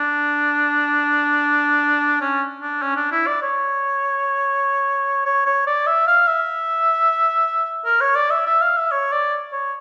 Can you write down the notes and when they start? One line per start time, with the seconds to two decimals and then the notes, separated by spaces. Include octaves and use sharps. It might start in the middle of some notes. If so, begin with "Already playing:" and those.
Already playing: D4
2.21 C#4
2.61 D4
2.82 C#4
2.97 D4
3.12 E4
3.27 D5
3.42 C#5
5.26 C#5
5.46 C#5
5.67 D5
5.87 E5
6.07 F5
6.27 E5
7.85 A#4
8.01 C#5
8.16 D5
8.31 E5
8.46 E5
8.62 F5
8.77 E5
8.92 C#5
9.12 D5
9.53 C#5